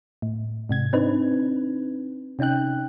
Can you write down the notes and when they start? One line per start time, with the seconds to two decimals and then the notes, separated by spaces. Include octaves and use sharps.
0.22 A2
0.69 G#2 C3 G#6
0.93 C4 D4 D#4 B4
2.39 C3 C#4 D#4 G5 F#6